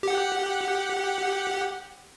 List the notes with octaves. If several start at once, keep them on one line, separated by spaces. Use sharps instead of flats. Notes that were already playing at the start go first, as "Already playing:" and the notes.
G4 F#5